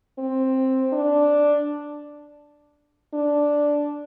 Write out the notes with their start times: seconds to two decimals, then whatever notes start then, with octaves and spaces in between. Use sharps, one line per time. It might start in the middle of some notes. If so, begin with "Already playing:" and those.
0.18 C4
0.93 D4
3.14 D4